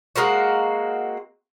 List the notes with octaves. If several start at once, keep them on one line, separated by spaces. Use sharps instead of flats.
G#3 A#3 C4 F#4